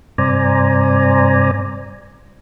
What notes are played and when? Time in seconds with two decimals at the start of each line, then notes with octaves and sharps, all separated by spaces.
0.18 G2 C3 C5 D5 G#5 A#5